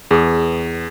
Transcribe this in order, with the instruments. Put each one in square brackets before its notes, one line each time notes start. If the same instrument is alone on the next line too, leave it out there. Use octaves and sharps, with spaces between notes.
[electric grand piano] E2 [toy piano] G#4 B4 D#6